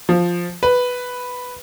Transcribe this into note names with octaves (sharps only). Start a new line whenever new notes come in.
F3
B4